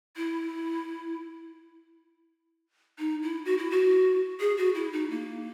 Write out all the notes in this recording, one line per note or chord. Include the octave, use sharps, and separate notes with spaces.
E4
D#4
E4
F#4
E4
F#4
G#4
F#4
E4
D#4
A#3